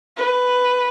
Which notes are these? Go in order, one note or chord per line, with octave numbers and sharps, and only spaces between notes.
B4